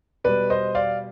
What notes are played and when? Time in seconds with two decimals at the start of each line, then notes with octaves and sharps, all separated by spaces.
0.24 B2 G3 B4 D5
0.50 C5 D#5
0.75 D5 F5